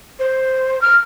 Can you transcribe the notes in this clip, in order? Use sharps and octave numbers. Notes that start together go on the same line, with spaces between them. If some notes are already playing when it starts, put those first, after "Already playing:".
C5
F6